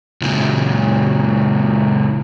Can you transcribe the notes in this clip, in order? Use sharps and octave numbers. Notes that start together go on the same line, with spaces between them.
C#2 A#2